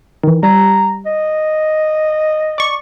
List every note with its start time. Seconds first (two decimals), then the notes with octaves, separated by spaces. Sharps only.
0.23 D#3 E3
0.43 G3 A#5
1.06 D#5
2.58 D5 C#6